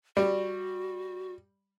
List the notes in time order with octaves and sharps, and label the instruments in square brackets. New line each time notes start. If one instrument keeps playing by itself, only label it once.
[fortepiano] G3 [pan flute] F#4